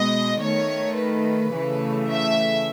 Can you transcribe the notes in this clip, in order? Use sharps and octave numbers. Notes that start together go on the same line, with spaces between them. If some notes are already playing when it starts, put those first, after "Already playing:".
Already playing: B2 G#3 B3 D#5
D#3 A3 C#5
B4
C#3 E3 A3
E5